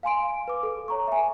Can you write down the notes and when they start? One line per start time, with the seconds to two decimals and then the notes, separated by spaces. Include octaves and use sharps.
0.03 F5 G#5 C6 D7
0.48 B4 D6
0.63 A4
0.88 C#5 A#5 C#6
1.07 E5 G#5